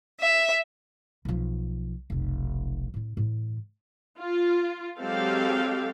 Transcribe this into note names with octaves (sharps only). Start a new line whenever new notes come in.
E5
B1 F3
F1 B1
A2 C4
A2 E3
F4
F#3 G#3 C4 G4 A4 F5